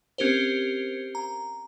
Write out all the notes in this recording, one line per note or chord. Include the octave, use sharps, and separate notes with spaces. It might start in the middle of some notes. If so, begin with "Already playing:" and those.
C4 C#4 G4 A#4 C5
A#5